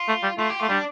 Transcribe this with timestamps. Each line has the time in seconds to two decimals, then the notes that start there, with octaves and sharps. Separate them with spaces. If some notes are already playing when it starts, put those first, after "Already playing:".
Already playing: F4
0.08 A3
0.23 G3
0.39 A3 F4
0.49 G4
0.60 A3 F4
0.69 G3 D4